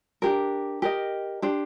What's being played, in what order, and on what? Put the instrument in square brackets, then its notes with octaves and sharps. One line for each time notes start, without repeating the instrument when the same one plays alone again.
[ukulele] D4 G4 A#4
G4 A#4 D#5
D4 G4 C5